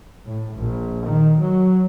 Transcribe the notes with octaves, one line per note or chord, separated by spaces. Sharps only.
A2
A#1
D#3
F#3